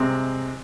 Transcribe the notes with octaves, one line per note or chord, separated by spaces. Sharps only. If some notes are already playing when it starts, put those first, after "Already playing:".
Already playing: C2 C3 G#3 C4